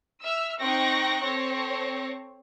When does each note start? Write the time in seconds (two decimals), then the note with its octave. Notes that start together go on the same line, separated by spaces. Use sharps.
0.24 E5 E6 F6
0.62 C4 D#4 G5 C#6 F#6 A#6
1.23 C4 A4 C#5 A#6